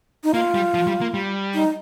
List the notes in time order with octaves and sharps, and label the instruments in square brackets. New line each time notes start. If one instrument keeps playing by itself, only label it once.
[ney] D#4
[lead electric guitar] A#3 [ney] F4
[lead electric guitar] G3
F3
G3
A#3
G3
[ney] D#4